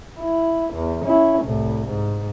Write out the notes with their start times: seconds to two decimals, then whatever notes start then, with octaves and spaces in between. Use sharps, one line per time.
0.20 E4
0.73 E2
1.04 C#4 E4
1.43 C2 A2
1.86 G#2